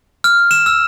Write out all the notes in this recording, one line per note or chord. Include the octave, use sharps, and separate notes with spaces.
F6
E7
E6